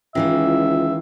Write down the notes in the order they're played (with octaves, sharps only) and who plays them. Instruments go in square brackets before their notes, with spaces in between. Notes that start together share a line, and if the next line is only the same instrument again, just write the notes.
[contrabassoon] C#2 [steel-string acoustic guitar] D#3 E3 F4 [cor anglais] E5